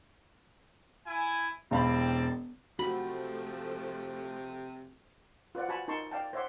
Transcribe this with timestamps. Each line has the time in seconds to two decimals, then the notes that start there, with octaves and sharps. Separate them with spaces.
1.05 E4 G#5
1.71 E1 G3 C4 F5 A5 B5
2.79 C3 F3 A3 F#4 B5
5.55 F4 B4 C5 D5 F#5
5.69 F#4 G#5 A5 B5 C#6
5.88 D#4 A#4 A5 C6 C#6
6.11 D5 F5 G5 A5
6.33 C5 C#5 E5 F#5 C6 D6